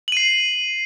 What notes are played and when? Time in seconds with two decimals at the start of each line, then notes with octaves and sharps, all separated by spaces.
0.08 F#7
0.12 D#7
0.17 C7